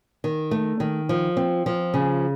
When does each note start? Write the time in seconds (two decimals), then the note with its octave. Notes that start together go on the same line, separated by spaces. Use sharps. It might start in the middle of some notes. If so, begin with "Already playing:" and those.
0.24 D#3
0.51 A3
0.80 D#3
1.09 F3
1.37 C4
1.66 F3
1.94 C#3